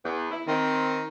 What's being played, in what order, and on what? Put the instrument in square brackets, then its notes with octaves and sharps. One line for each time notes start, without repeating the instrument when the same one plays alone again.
[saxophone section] E2 B3
E4
[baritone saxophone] D#3 [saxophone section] C4